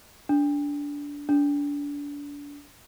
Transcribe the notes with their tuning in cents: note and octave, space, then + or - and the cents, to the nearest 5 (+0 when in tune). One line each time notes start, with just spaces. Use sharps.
D4 -20
D4 -30